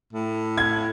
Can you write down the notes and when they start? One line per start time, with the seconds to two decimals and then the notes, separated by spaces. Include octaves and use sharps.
0.13 A2
0.58 G#6